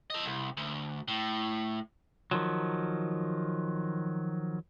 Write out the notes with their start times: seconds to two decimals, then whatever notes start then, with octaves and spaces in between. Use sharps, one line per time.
0.10 A4 D#5
0.25 C2
0.57 D2
1.08 A2
2.31 D#3 F3 F#3